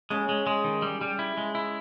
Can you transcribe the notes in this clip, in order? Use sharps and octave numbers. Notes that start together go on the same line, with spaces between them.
C#3 G#3
G#3
G#3
D#3
G3
G3
E4
G#3
E4